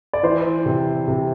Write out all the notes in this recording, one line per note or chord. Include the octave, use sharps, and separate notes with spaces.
D5
E3 C5
C3
C3